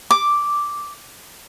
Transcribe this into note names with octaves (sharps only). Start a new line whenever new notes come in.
D6